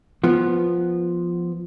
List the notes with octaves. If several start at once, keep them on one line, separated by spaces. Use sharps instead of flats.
F3 B3 F4